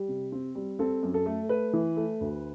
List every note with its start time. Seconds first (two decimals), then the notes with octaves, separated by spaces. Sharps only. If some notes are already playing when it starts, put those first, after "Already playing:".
Already playing: G3 G4
0.08 C3
0.32 C4
0.55 G3
0.79 C4 A4
1.03 F#2
1.14 A4
1.26 A3
1.49 A3 B4
1.73 E3
1.97 A3
2.21 D2